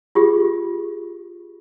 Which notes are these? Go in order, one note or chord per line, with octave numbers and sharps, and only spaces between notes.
F4 G4 G#4